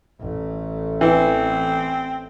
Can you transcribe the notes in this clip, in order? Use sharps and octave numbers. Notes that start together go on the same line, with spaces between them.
A1 A3
E3 C4